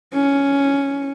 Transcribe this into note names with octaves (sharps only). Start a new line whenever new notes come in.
C#4